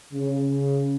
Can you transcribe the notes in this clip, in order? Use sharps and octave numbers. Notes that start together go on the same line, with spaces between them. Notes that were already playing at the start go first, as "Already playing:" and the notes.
C#3